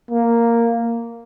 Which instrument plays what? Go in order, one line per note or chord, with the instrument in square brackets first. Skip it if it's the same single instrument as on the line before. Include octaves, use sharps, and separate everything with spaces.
[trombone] A#3